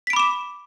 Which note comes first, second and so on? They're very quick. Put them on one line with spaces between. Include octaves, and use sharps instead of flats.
B6 D7 B5 D6 E7